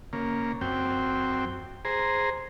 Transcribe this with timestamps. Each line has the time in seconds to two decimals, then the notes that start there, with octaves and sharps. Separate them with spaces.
0.13 C#3 A#3
0.61 F#2 C4 G5
1.85 G#4 C5 A#5